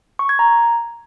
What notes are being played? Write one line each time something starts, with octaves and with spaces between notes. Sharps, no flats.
C#6
G#6
A#5